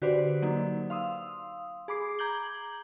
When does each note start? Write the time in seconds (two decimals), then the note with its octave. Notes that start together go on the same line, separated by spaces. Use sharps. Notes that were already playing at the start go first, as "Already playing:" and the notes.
0.02 D3 F#4 G4 B4 C5 D5
0.42 F#3 A#3 D#4
0.90 F5 C6 D#6 E6
1.88 G#4 B5 D6 C7
2.19 A#5 D6 G6 G#6 F#7 G7